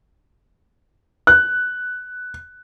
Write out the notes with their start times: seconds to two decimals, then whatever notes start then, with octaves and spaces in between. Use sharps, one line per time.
1.27 F#6